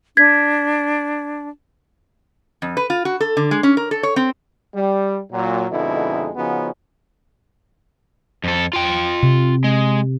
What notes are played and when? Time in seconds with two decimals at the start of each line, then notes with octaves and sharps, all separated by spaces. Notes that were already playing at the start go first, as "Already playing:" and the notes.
0.17 D4 G#6 B6
2.62 F2
2.77 B4
2.90 F4
3.05 F#4
3.20 A4
3.37 D3
3.51 G#3
3.63 C#4
3.77 A#4
3.91 A4
4.03 C#5
4.16 C4
4.75 G3
5.32 A#2 F#3
5.71 F2 B2 D3 G#3 D#4 E4
6.36 C#3 F3 B3 C#4 D#4 F#4
8.44 F2 A4
8.73 F4 G5
9.23 C3
9.64 G#3